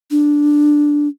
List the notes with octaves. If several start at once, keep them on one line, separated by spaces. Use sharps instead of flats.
D4